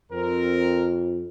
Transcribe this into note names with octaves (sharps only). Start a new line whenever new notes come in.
F2 C4 A#4